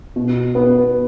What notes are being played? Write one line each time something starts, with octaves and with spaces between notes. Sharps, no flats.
B2
B3